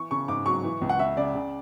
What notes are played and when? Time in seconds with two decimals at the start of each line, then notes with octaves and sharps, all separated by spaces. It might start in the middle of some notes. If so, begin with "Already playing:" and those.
Already playing: E3 C#6
0.11 C#3 C#6
0.28 G#2 D6
0.46 F#3 C#6
0.64 E3
0.81 C#2
0.89 F#5
0.99 C#3 E5
1.17 C#3 D5
1.35 C#3